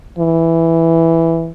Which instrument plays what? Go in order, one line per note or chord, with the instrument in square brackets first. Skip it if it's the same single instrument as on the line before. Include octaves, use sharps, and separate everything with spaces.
[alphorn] E3